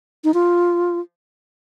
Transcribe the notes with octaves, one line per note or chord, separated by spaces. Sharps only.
D#4
F4